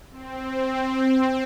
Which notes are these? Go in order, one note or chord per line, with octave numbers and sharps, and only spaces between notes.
C4